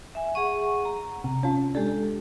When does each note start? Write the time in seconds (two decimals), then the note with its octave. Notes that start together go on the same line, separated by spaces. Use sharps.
0.15 E5 G#5
0.35 G#4 F#5 C#6 D#7
0.85 A#5
1.24 C3
1.43 C#4 F4 A5
1.75 G#3 D4 G4 A4